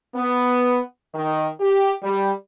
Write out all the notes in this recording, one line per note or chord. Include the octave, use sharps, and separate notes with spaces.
B3
D#3
G4
G3